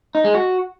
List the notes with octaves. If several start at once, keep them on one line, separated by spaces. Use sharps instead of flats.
D#4
G#3
F#4